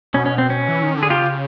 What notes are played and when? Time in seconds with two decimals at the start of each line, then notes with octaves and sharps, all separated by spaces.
0.14 B2 C#4
0.26 C#4
0.38 C4
0.50 C#4
0.68 E3
0.83 D#3
0.97 D3
1.03 G#4
1.10 C#3 F4 G4